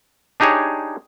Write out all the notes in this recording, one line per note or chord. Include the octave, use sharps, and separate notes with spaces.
D4 D#4 G4 G#4 C#5